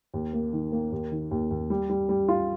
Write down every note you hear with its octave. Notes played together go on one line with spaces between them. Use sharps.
D#2
A#3
D#3
A#3
D#2
D#3
D#2
D#2
G3
G3
G3
F4